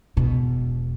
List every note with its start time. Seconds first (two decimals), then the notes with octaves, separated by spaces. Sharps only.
0.17 E1 B2